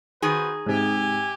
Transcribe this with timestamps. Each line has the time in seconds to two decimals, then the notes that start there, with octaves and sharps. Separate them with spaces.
0.22 D#3 F#4 G#4 B4 C5
0.66 G#2 C3 G4 E5 G#5